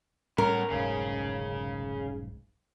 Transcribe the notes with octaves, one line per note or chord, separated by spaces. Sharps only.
A2 G3 B3 C#4 A#4 C#5
F1 B1 G#2 C#3 C#4